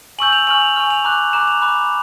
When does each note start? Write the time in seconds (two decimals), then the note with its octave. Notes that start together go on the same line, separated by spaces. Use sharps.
0.19 G#5 C#6 E6 G6 F#7
0.33 F7
0.47 G#5 C#6 F6 F#7
0.62 F7
0.76 G#5 C#6 F6
0.90 F7
1.05 A#5 D6 F#6
1.33 A#5 D6 F#6 E7
1.48 F7
1.62 B5 D6 F#6